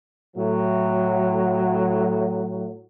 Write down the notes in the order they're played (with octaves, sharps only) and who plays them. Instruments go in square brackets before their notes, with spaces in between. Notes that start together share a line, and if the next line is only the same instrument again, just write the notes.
[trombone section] A2 F#3